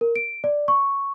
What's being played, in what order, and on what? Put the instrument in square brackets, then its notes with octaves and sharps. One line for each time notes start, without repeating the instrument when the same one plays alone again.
[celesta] A#4
D7
D5
C#6